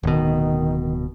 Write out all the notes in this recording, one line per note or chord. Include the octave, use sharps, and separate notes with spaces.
D1 B2 D#3